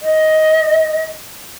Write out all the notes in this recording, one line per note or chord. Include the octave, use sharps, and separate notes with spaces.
D#5